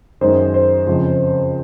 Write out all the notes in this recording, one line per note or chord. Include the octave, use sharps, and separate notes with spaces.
F#2 D#3 G#3 C5
C5
F2 C#3 F3 G#3